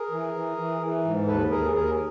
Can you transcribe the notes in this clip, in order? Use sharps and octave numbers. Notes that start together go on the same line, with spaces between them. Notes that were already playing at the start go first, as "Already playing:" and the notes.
Already playing: G#4 A#4
E3
E3
E3
E3
G#2
D#2 A4 B4
D#2 G#4 A#4
D#2 G#4 A#4